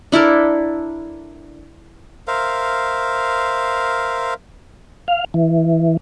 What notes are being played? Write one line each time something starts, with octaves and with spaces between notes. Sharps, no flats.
D4 E4 A4 A#4
A#4 C5 E5 F5
F5
E3